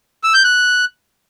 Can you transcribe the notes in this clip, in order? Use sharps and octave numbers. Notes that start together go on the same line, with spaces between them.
E6
G6
F#6